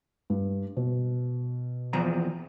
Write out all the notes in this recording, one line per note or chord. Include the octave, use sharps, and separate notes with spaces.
G2
B2
E2 F3 A#5